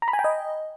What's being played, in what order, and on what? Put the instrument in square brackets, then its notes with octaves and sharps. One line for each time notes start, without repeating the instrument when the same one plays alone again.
[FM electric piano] A#5
B5
G#5
G5
D#5